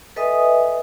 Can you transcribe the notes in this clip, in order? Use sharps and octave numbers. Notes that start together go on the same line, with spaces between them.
A4 B4 D#5 E5 G#5 D#6